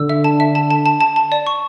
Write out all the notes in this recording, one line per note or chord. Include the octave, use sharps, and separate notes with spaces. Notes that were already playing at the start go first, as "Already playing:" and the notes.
Already playing: D3 E6
E5
A5
E5
A5
A5
A5
A5
A5
D5
C#6